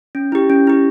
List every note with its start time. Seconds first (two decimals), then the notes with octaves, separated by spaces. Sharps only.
0.15 C#4
0.32 E4 G4
0.50 C#4
0.67 E4 G4